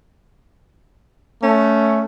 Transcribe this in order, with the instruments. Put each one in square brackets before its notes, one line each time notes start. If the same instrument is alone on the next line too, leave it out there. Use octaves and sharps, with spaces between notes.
[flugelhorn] A3 [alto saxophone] C#4